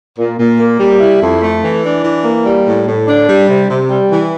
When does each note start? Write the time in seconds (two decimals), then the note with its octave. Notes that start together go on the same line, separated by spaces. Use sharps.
0.18 A#2
0.38 A#2
0.59 A#3
0.79 G3
1.01 E4
1.21 F2
1.42 A3
1.63 E3
1.83 D4
2.04 E3
2.25 A#3
2.45 G3
2.66 A2
2.87 A2
3.07 D4
3.28 G3
3.49 C3
3.69 C3
3.90 G3
4.11 E3